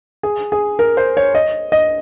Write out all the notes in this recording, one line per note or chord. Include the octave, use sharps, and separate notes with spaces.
G#4
G#4
A#4
C5
C#5
D#5
D#5